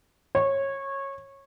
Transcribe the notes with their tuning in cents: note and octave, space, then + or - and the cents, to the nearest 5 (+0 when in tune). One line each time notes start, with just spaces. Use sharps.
C#5 -20